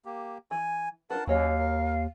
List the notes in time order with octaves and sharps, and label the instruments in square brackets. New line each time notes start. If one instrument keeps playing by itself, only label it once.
[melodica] A#3 G4
[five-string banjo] E3 [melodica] G#5
[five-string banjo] D4 F4 B4 [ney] A#4 [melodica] F#5 A5
[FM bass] D#2 [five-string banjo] F#3 C#5 D#5 [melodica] C#4 [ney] F5
[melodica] A#4